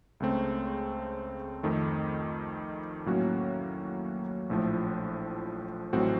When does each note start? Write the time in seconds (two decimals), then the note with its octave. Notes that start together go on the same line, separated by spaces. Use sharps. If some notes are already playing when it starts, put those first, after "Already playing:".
0.20 C#2 C#3 A3 C4
1.63 F2 D#3 A3
3.06 A2 F#3 A#3 C#4 F#4
4.50 A#1 A2 F3 A3
5.93 A1 A2 F#3 C4 F#4